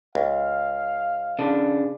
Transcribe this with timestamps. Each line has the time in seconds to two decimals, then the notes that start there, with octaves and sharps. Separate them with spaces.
0.15 C#2 F5
1.39 C#3 D4